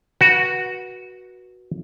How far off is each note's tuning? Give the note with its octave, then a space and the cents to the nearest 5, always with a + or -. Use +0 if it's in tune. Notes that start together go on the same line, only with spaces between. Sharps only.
F#4 +0 B4 -25 F#5 -20